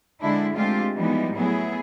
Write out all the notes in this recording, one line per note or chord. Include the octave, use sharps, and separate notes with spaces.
D3 G#3 D4 E4
G#3 A3 C4 D4 F4 G4
E3 F3 G3 G#3 B3 D#4
A2 F#3 B3 E4 G#4